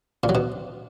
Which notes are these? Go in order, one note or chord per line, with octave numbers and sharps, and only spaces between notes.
A#2
F#3
B2